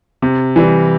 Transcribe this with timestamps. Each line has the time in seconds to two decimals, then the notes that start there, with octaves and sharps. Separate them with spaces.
0.22 C3
0.56 E3 G3